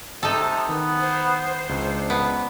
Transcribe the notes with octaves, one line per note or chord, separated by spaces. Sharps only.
C3 D#4 A4 D#6
D#3 B3
C5
C#2 D4
B3